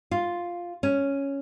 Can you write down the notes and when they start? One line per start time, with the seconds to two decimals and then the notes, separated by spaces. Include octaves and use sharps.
0.11 F4
0.83 C#4